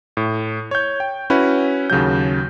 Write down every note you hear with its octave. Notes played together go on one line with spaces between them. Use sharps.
A2
C#5 G6
G5
C#4 E4 F#4 B4
D#2 C#3 F#3 G6